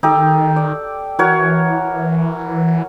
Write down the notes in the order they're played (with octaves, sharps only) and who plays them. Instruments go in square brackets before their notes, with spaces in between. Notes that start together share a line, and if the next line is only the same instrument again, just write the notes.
[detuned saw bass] D#3 [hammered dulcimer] D#4 G4 A4
[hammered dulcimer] D5
[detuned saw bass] E3 [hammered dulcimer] F#4 A#4 C#5